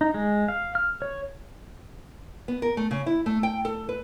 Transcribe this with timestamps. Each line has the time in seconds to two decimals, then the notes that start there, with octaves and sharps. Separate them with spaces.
0.01 D#4
0.14 G#3
0.48 F5
0.75 F6
1.02 C#5
2.48 B3
2.62 A#4
2.77 A3
2.91 C#3
3.06 E4
3.26 A3
3.43 G5
3.65 A4
3.89 B4